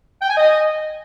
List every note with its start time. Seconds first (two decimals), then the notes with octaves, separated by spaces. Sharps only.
0.22 G5
0.30 G#5
0.37 D#5